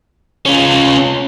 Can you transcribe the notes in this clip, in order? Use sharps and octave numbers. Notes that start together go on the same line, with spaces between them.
C#4 F4